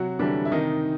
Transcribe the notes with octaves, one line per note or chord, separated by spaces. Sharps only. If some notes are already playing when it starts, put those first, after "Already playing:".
Already playing: C3 F#3 F#4
D3 E3 G3 D4
E4
C3 D#3 D#4